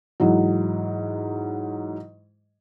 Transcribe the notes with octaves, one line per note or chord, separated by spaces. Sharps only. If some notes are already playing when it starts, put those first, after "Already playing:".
G#2 E3 F#3